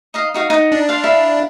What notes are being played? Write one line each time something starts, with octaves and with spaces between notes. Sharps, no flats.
D#4 D#5 F5
D#4 F#4 F5
D#4 F#5
D4
F5 C6
E4 A#4 F5